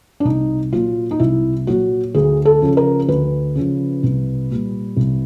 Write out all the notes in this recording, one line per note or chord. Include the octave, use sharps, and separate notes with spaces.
D4
C2 D#4
A#2 F#3 F4
D#4
C2 E4
A#2 F#3 F#4
D2 G#4
A4
C#3 F3
A#4
D2 B4
C#3 F3
C2
A#2 G3
C2